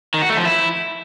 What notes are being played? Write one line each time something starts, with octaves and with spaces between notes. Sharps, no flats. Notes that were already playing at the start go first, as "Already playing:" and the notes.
D#3
F#4
A3
F3
E4